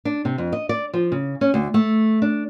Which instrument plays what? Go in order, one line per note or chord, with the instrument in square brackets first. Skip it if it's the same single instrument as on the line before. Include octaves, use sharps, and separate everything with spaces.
[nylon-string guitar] D4
C3
F2
D#5
D5
F3
C#3
C#4
D2
A3
D4